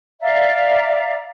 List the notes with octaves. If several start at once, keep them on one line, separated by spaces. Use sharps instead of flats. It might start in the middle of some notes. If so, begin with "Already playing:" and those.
D5 E5 F5 A#5